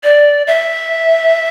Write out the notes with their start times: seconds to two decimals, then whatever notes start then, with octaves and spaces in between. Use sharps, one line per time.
0.04 D5
0.47 E5